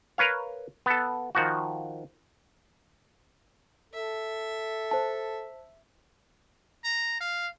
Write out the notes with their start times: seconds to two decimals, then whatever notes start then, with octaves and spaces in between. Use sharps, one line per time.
0.18 A#4 B4 C#5 F5
0.86 B3 A4
1.35 D#3 F3 F#4
3.94 A4 E5
4.91 C5 A5
6.84 A#5
7.20 F5